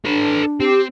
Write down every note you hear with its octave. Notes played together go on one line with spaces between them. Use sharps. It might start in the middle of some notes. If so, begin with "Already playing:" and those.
D4 A4 B4
C4 G4